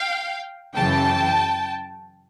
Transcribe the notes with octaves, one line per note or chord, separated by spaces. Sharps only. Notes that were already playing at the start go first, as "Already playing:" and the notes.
Already playing: F5 G5
F#2 C#3 E3 G5 A5